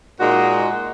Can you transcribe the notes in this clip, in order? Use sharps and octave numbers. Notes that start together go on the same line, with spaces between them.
A#2 G#3 D#4 F#4